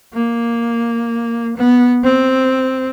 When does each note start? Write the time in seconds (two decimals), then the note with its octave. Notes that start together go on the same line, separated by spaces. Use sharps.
0.14 A#3
1.57 B3
2.03 C4